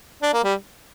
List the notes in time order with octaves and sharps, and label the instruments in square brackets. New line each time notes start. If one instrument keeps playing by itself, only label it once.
[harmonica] D4
A#3
G3